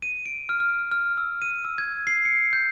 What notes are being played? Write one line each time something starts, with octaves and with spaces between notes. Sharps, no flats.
D#7
D7
F6
F6
F6
E6
D#7
E6
G#6
C7
C#7
G6